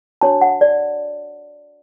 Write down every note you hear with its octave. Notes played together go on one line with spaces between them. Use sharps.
D4 F#4 C#5 A5
F#5
D5